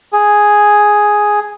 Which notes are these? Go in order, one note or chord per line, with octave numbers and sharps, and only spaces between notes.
G#4